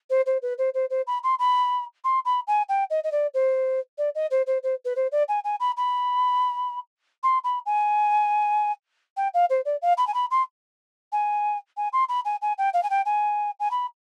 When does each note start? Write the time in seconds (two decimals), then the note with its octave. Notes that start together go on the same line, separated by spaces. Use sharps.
0.10 C5
0.26 C5
0.42 B4
0.58 C5
0.74 C5
0.90 C5
1.07 B5
1.24 C6
1.39 B5
2.04 C6
2.25 B5
2.47 G#5
2.69 G5
2.90 D#5
3.04 D#5
3.12 D5
3.34 C5
3.98 D5
4.15 D#5
4.31 C5
4.47 C5
4.63 C5
4.85 B4
4.96 C5
5.12 D5
5.28 G#5
5.44 G#5
5.60 B5
5.77 B5
7.23 C6
7.44 B5
7.66 G#5
9.17 G5
9.34 F5
9.50 C5
9.65 D5
9.82 F5
9.98 B5
10.07 G#5
10.14 B5
10.31 C6
11.12 G#5
11.77 G#5
11.93 C6
12.09 B5
12.25 G#5
12.42 G#5
12.58 G5
12.74 F5
12.83 G#5
12.90 G5
13.06 G#5
13.60 G#5
13.71 B5